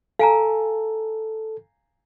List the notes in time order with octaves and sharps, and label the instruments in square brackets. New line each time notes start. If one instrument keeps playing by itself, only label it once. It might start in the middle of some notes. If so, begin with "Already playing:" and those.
[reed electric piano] A4 [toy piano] F5 G#5 A#5